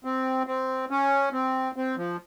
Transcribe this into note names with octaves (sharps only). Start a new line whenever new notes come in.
C4
C4
C#4
C4
C4
F3